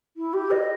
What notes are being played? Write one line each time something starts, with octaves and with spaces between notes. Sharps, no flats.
E4
G4
D#5